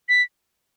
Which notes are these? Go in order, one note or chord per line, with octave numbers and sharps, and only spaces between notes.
B6